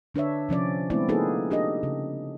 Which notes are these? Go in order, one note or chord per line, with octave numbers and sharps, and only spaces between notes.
D3 D4 B4 C#5 E5
C3 F3 C#4 D5
G#3 A3 B3 C4 E4 D5
A#3 D#4 F4 G#4 A4 B4
D4 G4 A4 D#5
C#3